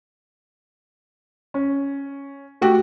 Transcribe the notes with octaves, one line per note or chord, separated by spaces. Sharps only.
C#4
A3 F#4 G4